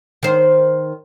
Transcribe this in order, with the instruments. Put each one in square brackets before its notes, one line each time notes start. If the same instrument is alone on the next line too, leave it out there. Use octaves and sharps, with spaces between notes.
[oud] D#3 C5